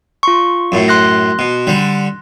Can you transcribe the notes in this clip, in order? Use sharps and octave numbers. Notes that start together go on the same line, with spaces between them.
F4 C6 C#6
F#2 A2
C6 F#6 A#6
B2
D3 G3